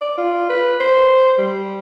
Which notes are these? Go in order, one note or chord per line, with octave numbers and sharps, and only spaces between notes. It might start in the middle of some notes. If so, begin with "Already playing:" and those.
D5
F4
B4
C5
G3